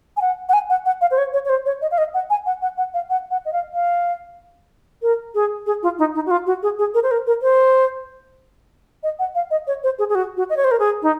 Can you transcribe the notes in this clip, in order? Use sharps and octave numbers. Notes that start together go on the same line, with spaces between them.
G#5
F#5
F#5
G#5
F#5
F#5
F5
C5
C#5
C#5
C#5
C5
C#5
D#5
F5
D#5
F#5
G#5
F#5
F#5
F#5
F5
F#5
F#5
D#5
F5
F5
A#4
G#4
G#4
F4
D#4
D#4
F#4
F4
F#4
G#4
G#4
A#4
C5
A#4
A#4
C5
D#5
F#5
F5
D#5
C#5
C5
G#4
G#4
F#4
F#4
D#5
C#5
C5
A#4
G#4
D#4